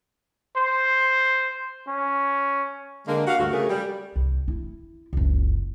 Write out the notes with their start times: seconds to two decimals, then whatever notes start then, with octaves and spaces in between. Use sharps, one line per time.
0.57 C5
1.88 C#4
3.07 D3 G#3 A#3 A#4
3.27 F#4 G4 F5
3.38 D2 G2 A3 F#4
3.52 C#3 A3 G#4 A#4
3.69 G3
4.16 C2
4.48 E4
5.13 F#1 C#2